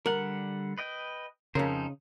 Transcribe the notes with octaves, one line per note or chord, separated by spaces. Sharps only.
D3 G3 A#4 F#5
B4 D#5 G5
F2 C#3 C#4 D#4 A#4 C5